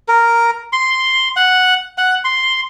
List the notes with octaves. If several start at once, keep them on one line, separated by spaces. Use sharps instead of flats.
A#4
C6
F#5
F#5
C6